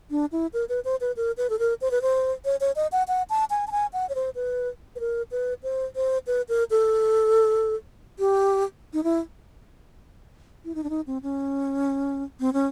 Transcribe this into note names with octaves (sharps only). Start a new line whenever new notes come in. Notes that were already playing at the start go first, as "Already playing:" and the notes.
D4
E4
A#4
B4
C5
B4
A#4
B4
A4
A#4
C5
B4
C5
C#5
C#5
D#5
F#5
F#5
A5
G#5
A5
G#5
F#5
C#5
C5
B4
B4
A#4
B4
C5
C5
B4
A#4
A4
G4
D#4
E4
E4
D#4
D4
D#4
C4
C#4
C4
C#4